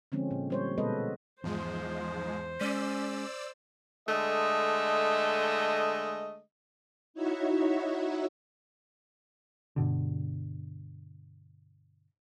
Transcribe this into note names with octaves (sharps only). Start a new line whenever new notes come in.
D3 F3 G#3 C4 C#4
A#2
G3 C5 C#5
B2 G#3 B3 A4 B4 D#5
E2 G#2 F3 G#3 C5
G#3 C#4 D5 E6
D3 G#3 A3 D#5
D#4 E4 F#4 C#5 E5
G2 B2 D3